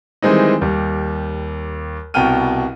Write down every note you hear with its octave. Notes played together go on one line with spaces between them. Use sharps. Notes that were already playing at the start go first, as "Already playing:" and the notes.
D#3 E3 G3 G#3 C4 D#4
D#2 G3
C2 B2 F#5 G5 F6 D#7